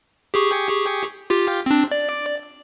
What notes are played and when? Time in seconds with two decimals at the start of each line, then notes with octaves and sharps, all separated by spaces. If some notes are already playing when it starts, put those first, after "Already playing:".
0.34 G4 G#4 C#6
1.30 F4 G4
1.66 C4 D4
1.92 D5